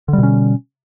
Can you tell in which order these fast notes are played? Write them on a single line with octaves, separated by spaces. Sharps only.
D3 G3 B2 C#4